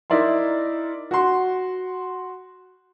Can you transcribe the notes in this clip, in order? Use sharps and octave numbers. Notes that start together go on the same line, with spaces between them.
D#4 E4 A#4 D5 E5 C6
F#4 F#5 C6